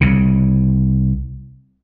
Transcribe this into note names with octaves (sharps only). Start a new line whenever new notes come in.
C2 C#3